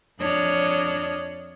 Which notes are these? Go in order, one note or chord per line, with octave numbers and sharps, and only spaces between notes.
F2 D4 C#5 D#5 F6 F#6